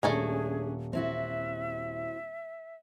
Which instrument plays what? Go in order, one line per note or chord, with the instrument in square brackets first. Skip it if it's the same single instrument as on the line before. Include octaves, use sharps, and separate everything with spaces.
[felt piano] D#1 [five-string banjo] A3 G#5 A#5 [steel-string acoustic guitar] C#4 D4 [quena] G#4
[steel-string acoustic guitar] C4 E4 F#4 [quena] E5